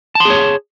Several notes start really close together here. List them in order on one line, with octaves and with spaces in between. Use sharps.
A5 C6 G#4 C#5